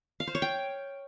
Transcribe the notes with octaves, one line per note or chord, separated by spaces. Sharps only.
F5
C5
C#5
G5